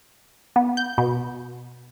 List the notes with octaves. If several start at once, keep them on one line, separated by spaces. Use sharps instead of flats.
B3
G6
B2